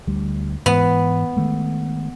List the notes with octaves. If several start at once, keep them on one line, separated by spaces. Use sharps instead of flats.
D2 G3
G#2 E3 B3
D#3 G#3 A3